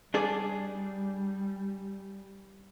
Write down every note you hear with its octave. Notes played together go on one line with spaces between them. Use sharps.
G3 D4 G#4 D5